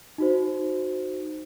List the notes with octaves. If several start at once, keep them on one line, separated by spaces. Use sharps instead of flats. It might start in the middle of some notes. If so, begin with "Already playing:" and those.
D#4 F#4 C5